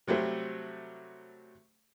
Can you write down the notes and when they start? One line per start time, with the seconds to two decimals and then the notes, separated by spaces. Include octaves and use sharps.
0.07 C3 F#3 G3 A3 C4